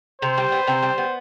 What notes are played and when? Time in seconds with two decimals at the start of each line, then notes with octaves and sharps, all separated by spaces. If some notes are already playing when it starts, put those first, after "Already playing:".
0.22 C3 C5
0.38 G3
0.52 B3
0.67 C3
0.83 G3
0.98 B3